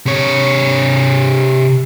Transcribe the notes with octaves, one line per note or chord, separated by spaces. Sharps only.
C3 C#5